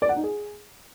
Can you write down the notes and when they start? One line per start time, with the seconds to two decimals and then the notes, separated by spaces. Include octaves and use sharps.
0.02 D5
0.09 F#5
0.16 D#4
0.23 G#4